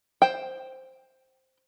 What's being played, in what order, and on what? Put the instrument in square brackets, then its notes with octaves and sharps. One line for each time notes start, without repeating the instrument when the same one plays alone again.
[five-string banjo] C5 G5